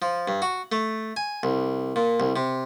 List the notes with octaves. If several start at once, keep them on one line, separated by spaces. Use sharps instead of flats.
F3
G2
F#4
A3
G#5
C2
A#2
C2
C3